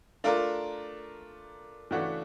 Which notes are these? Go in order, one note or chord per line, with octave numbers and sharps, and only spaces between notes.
A3 D4 F4 A#4
C#3 E3 A3 D4 F#4